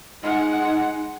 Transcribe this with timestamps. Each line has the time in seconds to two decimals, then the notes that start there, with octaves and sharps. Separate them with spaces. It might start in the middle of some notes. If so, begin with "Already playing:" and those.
0.23 G#3 D#4 F#5